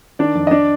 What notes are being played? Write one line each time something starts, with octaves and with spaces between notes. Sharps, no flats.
D#3 D4 D5
F2
D#5
D4 D5